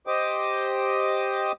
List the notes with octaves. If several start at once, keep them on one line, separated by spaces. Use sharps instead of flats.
G4 C5 D#5 G5 D6 D#6